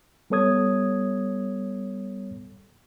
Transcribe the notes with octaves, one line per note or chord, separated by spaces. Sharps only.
G3 B3 A4 C#5 D#6 G#6